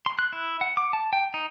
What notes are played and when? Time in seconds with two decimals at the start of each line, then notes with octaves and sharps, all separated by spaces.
0.06 C6
0.19 F#6
0.33 E4
0.61 F#5
0.77 D6
0.93 A5
1.13 G5
1.34 D#4